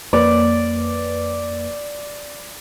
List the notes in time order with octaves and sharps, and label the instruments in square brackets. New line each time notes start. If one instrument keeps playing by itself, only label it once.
[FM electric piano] F2 A#3 B4 [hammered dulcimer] D5